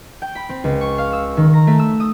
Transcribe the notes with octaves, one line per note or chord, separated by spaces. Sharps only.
G5
B5
C4
C#2
C#6
F5
E6
D#3
A#5
A3
E6
D#6